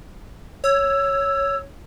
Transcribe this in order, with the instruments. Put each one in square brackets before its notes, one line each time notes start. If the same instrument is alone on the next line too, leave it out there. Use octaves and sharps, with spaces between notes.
[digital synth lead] C#5 [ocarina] E6